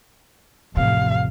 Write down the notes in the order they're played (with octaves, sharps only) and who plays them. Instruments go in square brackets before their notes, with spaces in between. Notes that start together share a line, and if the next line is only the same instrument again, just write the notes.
[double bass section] A1 F2 [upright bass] C3 [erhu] F5